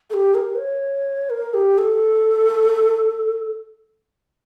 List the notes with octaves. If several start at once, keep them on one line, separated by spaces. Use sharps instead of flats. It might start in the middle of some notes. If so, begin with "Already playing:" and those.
A4
G4
A#4
C#5
A#4
G4
A4